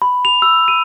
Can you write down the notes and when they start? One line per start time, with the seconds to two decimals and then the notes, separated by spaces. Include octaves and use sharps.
0.02 B5
0.25 F7
0.42 E6
0.68 D#7